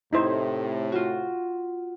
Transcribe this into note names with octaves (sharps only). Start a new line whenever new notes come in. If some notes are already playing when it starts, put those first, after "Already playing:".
A2 C3 D#4 E4 C5
F4 F#4